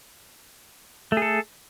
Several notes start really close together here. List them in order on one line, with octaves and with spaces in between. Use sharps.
A3 G#4 A4